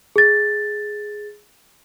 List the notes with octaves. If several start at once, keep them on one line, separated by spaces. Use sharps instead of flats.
G#4 A6